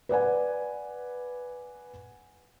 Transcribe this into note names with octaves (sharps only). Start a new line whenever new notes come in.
B4 D5 F#5 G#5